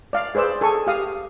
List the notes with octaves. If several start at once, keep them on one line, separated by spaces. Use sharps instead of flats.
D5 F5
G#4 B4 C5 D5 E6
G#4 A4 G#5 C#6
G4 F5 D#6